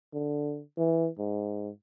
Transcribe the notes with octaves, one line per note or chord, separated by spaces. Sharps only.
D3
E3
G#2